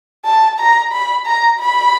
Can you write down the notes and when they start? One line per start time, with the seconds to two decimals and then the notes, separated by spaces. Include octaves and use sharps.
0.25 A5
0.59 A#5
0.92 B5
1.26 A#5
1.59 B5